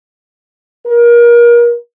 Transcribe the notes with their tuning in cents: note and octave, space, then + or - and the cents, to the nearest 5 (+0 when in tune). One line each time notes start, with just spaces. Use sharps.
A#4 +30